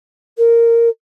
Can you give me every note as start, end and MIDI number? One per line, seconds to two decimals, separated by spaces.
0.37 0.89 70